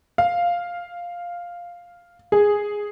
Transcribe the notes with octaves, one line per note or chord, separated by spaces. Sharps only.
F5
G#4